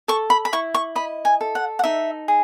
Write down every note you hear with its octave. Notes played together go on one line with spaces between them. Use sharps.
A4 C#6
B5
B5
E4 C#6
C#6
D#5 B5
G#5
A4
F#5
F#5
D#4 E5
G#4